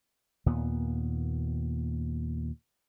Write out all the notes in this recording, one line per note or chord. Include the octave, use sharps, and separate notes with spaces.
D#2 A#2 B3